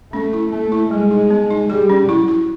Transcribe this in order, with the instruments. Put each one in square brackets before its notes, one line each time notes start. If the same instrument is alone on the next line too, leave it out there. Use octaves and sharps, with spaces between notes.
[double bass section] A3 [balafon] C#4
[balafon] E4
[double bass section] A3 [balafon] A#3
[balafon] E4
[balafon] G3 [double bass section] G#3
[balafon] D#4
B3
D#4
[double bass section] G3 [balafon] G#4
[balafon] C#4
[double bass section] F#3 [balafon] E4
[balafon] E4